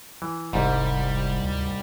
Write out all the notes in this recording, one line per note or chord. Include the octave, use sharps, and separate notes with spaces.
E3
F1 C2 G#2 G3
D2